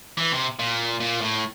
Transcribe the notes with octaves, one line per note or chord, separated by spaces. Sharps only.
E3
C3
A#2
A#2
A2